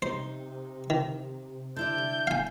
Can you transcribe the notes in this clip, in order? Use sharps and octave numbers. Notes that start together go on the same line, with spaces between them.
C3 D#4 C5
D#3
D3 E4 D5 G6
D1 F5 G#5